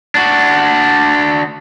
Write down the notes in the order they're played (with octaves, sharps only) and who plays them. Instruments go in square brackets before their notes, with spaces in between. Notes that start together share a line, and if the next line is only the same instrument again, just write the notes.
[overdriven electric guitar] D4 F#4